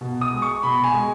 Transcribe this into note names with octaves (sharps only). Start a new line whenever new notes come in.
B2
D#6
G#3
C#6
B2 B5
G#5
G#3